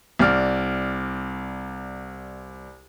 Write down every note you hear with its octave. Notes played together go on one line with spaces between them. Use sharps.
C2 D5 F6